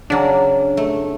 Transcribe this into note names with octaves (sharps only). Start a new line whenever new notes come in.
C#3 F#3 D4
A3